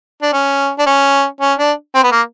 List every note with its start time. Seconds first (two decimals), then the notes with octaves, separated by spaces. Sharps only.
0.22 D4
0.33 C#4
0.79 D4
0.87 C#4
1.41 C#4
1.59 D4
1.95 C4
2.04 B3
2.12 A#3